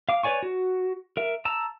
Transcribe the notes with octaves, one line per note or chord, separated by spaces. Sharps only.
F5 D6
B4 C#5 D5 G#5 C#6
F#4
A#4 E5
A5 A#5 E6